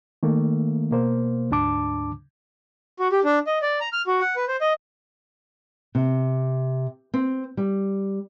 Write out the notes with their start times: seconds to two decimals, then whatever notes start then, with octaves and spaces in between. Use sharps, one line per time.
0.23 D#3 A3 A#3
0.91 B2 A#3 C5
1.50 D2 G#2 D4 A5 D6
2.99 F#4
3.12 G4
3.24 D4
3.47 D#5
3.62 D5
3.81 A#5
3.93 F6
4.07 F#4
4.21 F#5
4.36 B4
4.48 C5
4.61 D#5
5.95 C3
7.14 C4
7.57 G3